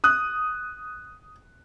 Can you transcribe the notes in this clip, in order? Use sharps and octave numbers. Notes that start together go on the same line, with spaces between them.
D#6 F#6